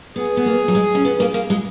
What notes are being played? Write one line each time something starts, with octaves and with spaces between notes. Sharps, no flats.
B3 G#4
B3
A#3
F#3
G#3
C#4
B3
A#3
A#3
G#3